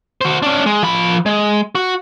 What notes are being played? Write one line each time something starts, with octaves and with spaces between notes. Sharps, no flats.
F#4 C5
C#4 D4
G#3
F3 B5
G#3
F#4